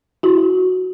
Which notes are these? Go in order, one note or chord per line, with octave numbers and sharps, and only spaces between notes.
E4 F#4